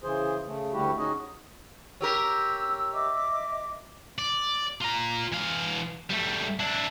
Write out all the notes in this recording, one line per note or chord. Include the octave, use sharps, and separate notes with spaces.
C#3 E3 G#4 C5
C#3 A3
D2 D3 G3 E4 F#4 G4
C#4 D#4 F#4 G#4 D#5
C#4 G4 A#4 E6
D#5 E5 D6
D5
F4 A#5
E3 F5
G3 A3
D4 E4